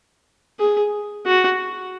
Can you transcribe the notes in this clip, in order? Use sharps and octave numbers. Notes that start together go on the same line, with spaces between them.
G#4
F#4